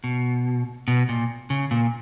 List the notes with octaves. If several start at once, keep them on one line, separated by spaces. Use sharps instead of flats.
B2
B2
A#2
C#3
A#2